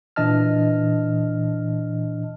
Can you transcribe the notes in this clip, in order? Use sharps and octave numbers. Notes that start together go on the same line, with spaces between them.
A#2 E3 D4 D#5 A5 F6